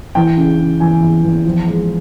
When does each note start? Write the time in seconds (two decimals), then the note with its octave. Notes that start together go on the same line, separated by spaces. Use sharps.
0.15 E3 G5
0.37 C#3
0.59 C#3
0.80 E2 G#5
1.01 E2
1.23 E2
1.45 F3
1.67 G#3